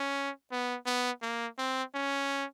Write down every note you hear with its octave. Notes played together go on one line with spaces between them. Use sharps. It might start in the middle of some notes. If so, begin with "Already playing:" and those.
Already playing: C#4
B3
B3
A#3
C4
C#4